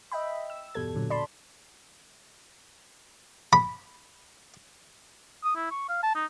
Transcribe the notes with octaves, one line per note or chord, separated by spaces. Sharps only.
D#5 E5 G5 B5
E6
E2 G2 B2 G3 A4 G#6
A#2 D3 F#3
D5 A5 B5 C6
B5
D#6
E4
C#6
F5
A5
D#4